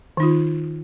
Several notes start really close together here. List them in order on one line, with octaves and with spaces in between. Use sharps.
D#3 D#4 F4